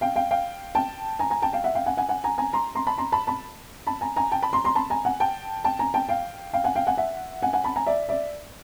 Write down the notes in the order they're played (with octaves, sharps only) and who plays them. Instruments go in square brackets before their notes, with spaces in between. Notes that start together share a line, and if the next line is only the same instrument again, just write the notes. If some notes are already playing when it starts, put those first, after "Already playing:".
[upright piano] F5 G5
F5 G5
F5 G5
G5 A5
G#5 A#5
G#5 A#5
G5 A5
F5 G5
E5 F#5
F5 G5
F#5 G#5
F#5 G#5
F#5 G#5
G#5 A#5
G#5 A#5
A#5 C6
A#5 C6
A5 B5
A#5 C6
A5 B5
A5 B5
A5 B5
G#5 A#5
G#5 A#5
G5 A5
A5 B5
A#5 C6
A#5 C6
A5 B5
G#5 A#5
F#5 G#5
G5 A5
G5 A5
G#5 A#5
G5 A5
F5 G5
F5 G5
F#5 G#5
F5 G5
F#5 G#5
E5 F#5
F#5 G#5
F#5 G#5
A5 B5
G#5 A#5
D5 E5
D5 E5